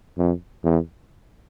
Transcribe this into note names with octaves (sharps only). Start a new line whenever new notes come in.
F2
E2